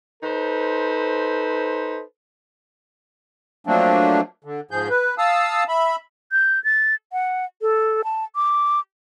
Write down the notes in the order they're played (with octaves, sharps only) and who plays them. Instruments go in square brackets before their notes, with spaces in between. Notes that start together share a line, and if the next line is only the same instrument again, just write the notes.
[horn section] D#4 A4 B4 C5
[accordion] F3 F#3 A3 A#3 C4 D4
D3
G#2 F3 G#4 G6
B4
F5 A5 D#6 E6
E5 B5
[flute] G6
A6
F#5
A4
A5
D6